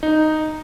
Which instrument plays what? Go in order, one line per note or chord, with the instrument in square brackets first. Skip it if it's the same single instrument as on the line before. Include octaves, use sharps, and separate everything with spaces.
[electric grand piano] D#4